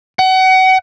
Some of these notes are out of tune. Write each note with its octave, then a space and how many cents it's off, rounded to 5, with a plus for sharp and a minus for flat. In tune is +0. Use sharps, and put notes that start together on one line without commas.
F#5 +30